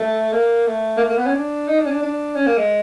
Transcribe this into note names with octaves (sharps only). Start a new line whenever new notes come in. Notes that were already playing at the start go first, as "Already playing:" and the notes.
Already playing: A3
A#3
A3
A#3
A3
A#3
B3
C#4
D4
D#4
D4
C#4
D4
D4
C#4
A#3
G#3